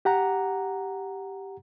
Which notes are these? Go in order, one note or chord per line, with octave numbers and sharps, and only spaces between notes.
G4 F#5 A#5